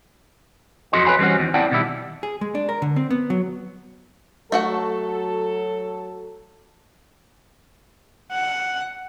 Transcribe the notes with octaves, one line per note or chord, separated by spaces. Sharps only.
F2 F#3 F#4 A4 D#5 C6
B4 C#5 G5 G#5 B5 C6
E3 G3 C4 C#4 F#4
E2 D#3
C4 E4 D5 F#5 G5 A5
B2 D#3 G3 E4
G#4
G#3
D4
A#4
D3
C4
B3
F#3
F#3 A3 F#4 A4 F#5
F#5